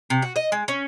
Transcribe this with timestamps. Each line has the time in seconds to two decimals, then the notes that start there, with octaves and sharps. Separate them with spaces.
0.10 C3
0.22 F#4
0.36 D#5
0.52 G#3
0.68 C#4